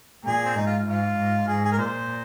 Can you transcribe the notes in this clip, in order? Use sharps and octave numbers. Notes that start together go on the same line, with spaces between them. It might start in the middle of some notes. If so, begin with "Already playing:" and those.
A#2 G#4
C4
G#2 D#4
F4
G#2 F4
G#2
G#2 G#4
G#4
A#4
A#2 C5